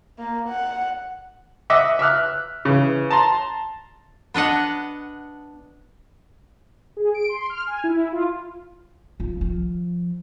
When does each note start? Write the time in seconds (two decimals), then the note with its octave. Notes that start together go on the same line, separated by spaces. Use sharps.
0.19 A#3
0.49 F#5
1.70 D#5 E5 F#5 D6
1.99 E5 D6 F6 F#6
2.65 C#3 E3
3.10 A5 A#5 C6
4.34 B3 D4 D#5 F#5
6.97 G#4
7.14 D7
7.29 C6
7.50 F6
7.67 G#5
7.84 E4
8.12 F4
9.20 F3
9.41 F3